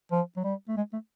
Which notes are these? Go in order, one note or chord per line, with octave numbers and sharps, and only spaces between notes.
F3
F#3
G3
A3
G#3
A3